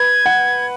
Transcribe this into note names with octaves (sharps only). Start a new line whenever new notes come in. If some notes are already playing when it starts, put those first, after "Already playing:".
Already playing: B4 G#6
F#5